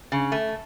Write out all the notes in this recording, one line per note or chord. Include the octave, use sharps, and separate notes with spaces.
C#3
A3